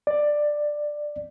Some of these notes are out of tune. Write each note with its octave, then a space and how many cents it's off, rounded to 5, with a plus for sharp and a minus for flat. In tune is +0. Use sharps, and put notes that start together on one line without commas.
D5 +10